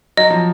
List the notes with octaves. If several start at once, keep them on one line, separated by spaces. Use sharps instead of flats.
F#3 D#5
F3